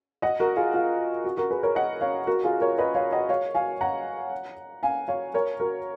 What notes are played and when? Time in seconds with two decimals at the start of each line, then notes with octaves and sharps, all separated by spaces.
0.22 D#5 F#5
0.40 F#4 A#4
0.57 F4 G#4
0.74 F4
1.24 F#4
1.37 F#4 A#4
1.50 G#4 B4
1.63 A#4 C#5
1.75 D#5 F#5
2.01 C#5 F5
2.27 F#4 A#4
2.44 F4 G#4
2.61 A#4 C#5
2.78 B4 D#5
2.95 C#5 F5
3.12 D#5 F#5
3.29 C#5 F5
3.55 F5 G#5
3.81 F#5 A#5
4.83 F5 G#5
5.08 C#5 F5
5.34 A#4 C#5
5.60 F#4 A#4